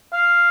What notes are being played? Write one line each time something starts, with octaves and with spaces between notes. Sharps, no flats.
F5